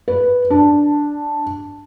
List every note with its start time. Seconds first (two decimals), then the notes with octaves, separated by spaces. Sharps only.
0.08 B4
0.50 D4